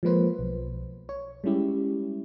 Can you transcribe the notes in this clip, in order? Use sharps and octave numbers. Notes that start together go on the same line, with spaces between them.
F3 G#3 A#3 B4 C5
B1
C#5
G3 G#3 C#4 E4 G4